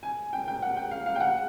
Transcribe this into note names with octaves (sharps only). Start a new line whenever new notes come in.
G#5
G5
G5
F#5
G5
F5
F5
G5
F#5